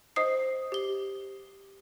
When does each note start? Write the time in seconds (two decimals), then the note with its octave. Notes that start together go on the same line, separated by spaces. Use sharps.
0.16 C5 D#5 D#6 C7
0.72 G4 G7